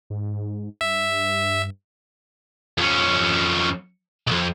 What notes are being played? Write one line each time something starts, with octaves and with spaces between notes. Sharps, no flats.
G#2
G2 E5
F2 C#4
B1 F2